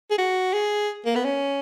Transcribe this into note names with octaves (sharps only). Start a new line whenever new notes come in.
G#4
F#4
G#4
A#3
B3
C#4